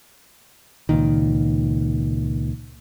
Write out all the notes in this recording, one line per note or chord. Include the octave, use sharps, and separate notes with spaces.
C#2 A#2 D#3